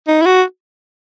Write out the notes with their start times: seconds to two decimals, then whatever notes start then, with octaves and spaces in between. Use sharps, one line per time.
0.07 D#4
0.21 E4
0.26 F#4